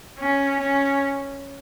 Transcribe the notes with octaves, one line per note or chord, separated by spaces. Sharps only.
C#4
C#4